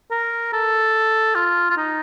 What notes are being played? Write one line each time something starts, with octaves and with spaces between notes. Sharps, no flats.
A#4
A4
F4
F4
D#4